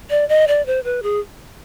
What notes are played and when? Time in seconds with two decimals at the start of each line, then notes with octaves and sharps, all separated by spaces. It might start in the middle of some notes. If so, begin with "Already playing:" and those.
0.10 D5
0.29 D#5
0.48 D5
0.66 C5
0.84 B4
1.03 G#4